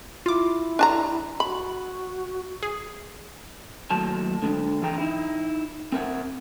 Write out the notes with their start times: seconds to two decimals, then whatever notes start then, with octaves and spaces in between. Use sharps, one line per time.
0.26 E4 F4 D6
0.79 D4 A5 A#5
1.40 F#4 B5
2.63 G#4
3.90 D#2 A2 F#3 A5
4.42 D3 G#3 A3 D4
4.82 E3 G#4 G5 A#5
4.98 D#4 E4
5.92 C4 A#4 E5 F#5